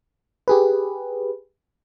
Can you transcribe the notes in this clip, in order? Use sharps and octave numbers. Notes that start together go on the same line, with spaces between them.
G4 G#4 B4